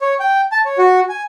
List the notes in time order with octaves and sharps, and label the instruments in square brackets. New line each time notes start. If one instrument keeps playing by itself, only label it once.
[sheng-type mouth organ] C#5
G5
A5
C#5
F#4
G#5